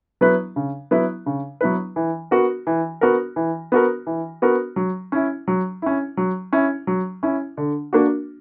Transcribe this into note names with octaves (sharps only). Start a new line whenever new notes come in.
F#3 B3 E4 B4
C#3
F#3 B3 E4 B4
C#3
F#3 B3 E4 B4
E3
B3 F#4 A#4
E3
B3 F#4 A#4
E3
B3 F#4 A#4
E3
B3 F#4 A#4
F#3
C#4 E4
F#3
C#4 E4
F#3
C#4 E4
F#3
C#4 E4
D3
A#3 D4 F#4